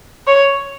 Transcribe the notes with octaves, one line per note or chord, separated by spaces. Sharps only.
C#5